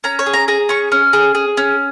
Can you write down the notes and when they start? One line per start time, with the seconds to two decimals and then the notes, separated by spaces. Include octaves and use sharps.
0.04 C#4 A#5
0.19 C#5
0.26 G#4
0.33 A#5
0.48 G#4 A#5
0.69 C#4 C#6
0.92 C#4
1.13 G#4
1.35 G#4
1.57 C#4